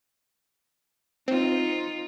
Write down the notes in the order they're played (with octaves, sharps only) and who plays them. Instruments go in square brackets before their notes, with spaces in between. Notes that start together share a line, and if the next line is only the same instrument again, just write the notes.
[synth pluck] C4 [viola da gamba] D#4 F4